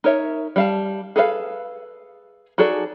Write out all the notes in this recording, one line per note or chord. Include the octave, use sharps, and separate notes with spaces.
D#4 A#4 C#5 E5
G3 F5 A5
G#4 A4 B4 D#5 F5
D#4 F#4 G#4 A4 D5